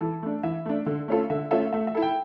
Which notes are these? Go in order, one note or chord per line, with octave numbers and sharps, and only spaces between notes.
E3 A4
A3 D4
E3 E5
A3 D4
D3
A3 C#4 F4 A4
D3 E5
A3 C#4 F4 A4 E5
A3 E5
E5
E4 A4
G5